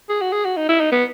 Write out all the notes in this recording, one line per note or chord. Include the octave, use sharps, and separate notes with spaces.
G#4
F#4
G#4
F#4
D#4
E4
D#4
B3